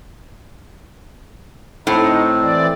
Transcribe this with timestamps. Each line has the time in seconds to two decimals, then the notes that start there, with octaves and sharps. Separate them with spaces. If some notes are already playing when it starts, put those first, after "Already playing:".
1.87 A2 C4 D#4
2.41 E3 D5